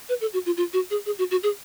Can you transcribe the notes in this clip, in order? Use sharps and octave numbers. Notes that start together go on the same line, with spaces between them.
B4
A4
F#4
F4
F4
F#4
G#4
G#4
F#4
F#4
G#4